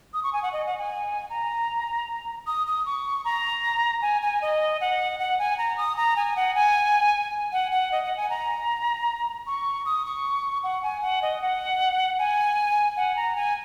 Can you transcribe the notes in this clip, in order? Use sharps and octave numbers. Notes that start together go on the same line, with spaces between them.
D#6
C#6
G#5
F#5
D#5
F#5
G#5
A#5
D#6
D#6
C#6
A#5
G#5
G#5
D#5
F#5
F#5
G#5
A#5
D#6
A#5
G#5
F#5
G#5
F#5
F#5
D#5
F#5
G#5
A#5
C#6
D#6
C#6
F#5
G#5
F#5
D#5
F#5
G#5
F#5
A#5
G#5